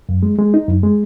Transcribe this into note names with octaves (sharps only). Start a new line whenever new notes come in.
F#2
G#3
G#3
D#4
F#2
G#3